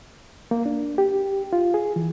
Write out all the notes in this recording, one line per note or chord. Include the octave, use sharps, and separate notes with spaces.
A#3
D4
G4
F4
G#4
E3